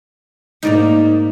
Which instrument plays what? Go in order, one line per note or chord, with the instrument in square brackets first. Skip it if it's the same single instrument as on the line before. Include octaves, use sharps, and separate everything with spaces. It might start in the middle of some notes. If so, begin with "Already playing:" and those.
[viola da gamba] G#2 G#3 A#3 [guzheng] D#4 D5 A#5